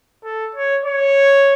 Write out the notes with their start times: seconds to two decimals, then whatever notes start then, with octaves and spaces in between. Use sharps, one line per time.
0.24 A4
0.55 C#5
0.85 C#5